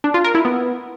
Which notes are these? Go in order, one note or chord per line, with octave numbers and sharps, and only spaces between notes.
D4
F4
A#4
E4
B3